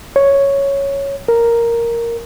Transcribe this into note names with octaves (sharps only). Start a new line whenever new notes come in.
C#5
A#4